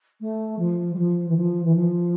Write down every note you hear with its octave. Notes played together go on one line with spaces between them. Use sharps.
A3
F3
G3
F3
E3
F3
E3
F3